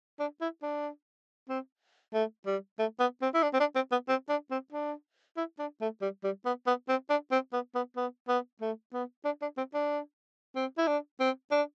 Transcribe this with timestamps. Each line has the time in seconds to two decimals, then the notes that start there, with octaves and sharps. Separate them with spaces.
0.19 D4
0.41 E4
0.62 D4
1.49 C4
2.14 A3
2.46 G3
2.79 A3
3.00 B3
3.22 C4
3.34 E4
3.43 D4
3.53 C4
3.60 D4
3.75 C4
3.92 B3
4.08 C4
4.29 D4
4.51 C4
4.72 D4
5.37 E4
5.59 D4
5.81 A3
6.01 G3
6.24 G3
6.45 B3
6.67 B3
6.89 C4
7.10 D4
7.31 C4
7.53 B3
7.75 B3
7.96 B3
8.28 B3
8.61 A3
8.93 B3
9.25 D4
9.42 D4
9.57 C4
9.74 D4
10.55 C4
10.78 E4
10.87 D4
11.20 C4
11.51 D4